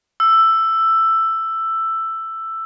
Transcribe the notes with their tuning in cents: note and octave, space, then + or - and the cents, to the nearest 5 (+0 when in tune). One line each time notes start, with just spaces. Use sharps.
E6 +10